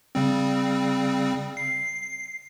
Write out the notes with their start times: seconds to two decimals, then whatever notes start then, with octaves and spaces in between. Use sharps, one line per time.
0.15 C#3 G3 C4
1.57 C7